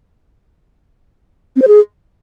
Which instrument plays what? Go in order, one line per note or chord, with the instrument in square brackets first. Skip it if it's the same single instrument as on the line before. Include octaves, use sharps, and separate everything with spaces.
[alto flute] C4
C5
G#4